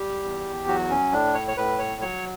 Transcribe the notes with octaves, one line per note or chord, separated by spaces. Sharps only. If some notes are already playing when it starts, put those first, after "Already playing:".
Already playing: G3 G4
E2
F#3 F#4
C#4
A2 D4
C#5
C#5
A2 B4
C#5
F#3 C#5